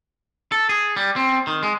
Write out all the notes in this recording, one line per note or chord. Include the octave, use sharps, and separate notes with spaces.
A4
G#4
G3
C4
D#3
G#3